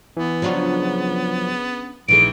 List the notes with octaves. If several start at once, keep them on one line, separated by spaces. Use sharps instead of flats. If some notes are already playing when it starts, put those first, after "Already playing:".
E3 B3
C#3 F3 F#3 D4 F4 F#4
A#1 D#3 E3 A3 G#4 D7